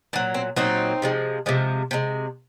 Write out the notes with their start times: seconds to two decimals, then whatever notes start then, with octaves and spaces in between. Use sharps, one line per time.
0.13 A#2 F#3 C4
0.34 C4
0.56 A#2 F#3 C4 D#4
1.02 C3 F3 G#3
1.46 C3 F3 G#3
1.91 C3 F3 G#3